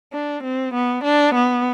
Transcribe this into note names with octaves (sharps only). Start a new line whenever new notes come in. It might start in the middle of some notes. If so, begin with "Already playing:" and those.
D4
C4
B3
D4
B3